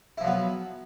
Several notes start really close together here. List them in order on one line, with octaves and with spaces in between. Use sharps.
E4 F3 F#3 B3